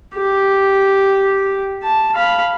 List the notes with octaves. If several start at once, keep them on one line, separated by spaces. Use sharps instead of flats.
G4
A5
F5 B5